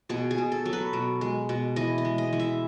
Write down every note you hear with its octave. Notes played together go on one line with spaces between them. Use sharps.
B2 G#4
G#4
B2
A4
F#3
B4
B2
G#3
B2
E3 D#5
D#5
G#3
D#5
E3
E5